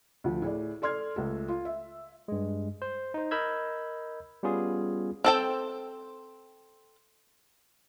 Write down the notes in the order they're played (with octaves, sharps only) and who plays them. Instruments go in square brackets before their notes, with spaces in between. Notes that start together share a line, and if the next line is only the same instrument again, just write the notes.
[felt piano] D2 F3
A2 G#4 D5
A4 D5 C6 F6 G#6
C#2 A3 A4
F4
E5
[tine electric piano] G2 G#3
C5
D#4 C5
A#4 D#5 B5 E6 G6 G#6
G3 B3 C#4 F4 G#4
[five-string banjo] C4 A4 G5